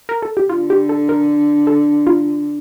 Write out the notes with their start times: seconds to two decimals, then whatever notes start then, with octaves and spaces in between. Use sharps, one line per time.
0.09 A#4
0.22 A4
0.37 G4
0.49 D3 F4
0.70 G4
0.89 A4
1.09 A#4
1.67 A4
2.07 F4